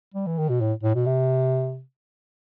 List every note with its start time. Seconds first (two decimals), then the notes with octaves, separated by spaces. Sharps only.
0.14 G3
0.26 E3
0.38 D#3
0.49 B2
0.61 A2
0.83 A2
0.95 B2
1.06 C3